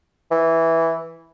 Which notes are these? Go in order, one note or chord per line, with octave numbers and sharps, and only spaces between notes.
E3